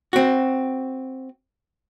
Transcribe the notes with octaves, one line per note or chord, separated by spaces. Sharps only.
C4 F#4